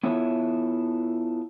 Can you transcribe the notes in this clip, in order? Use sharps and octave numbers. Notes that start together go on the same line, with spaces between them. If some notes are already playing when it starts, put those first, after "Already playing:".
B3 E4 F4 A4 C#5 E5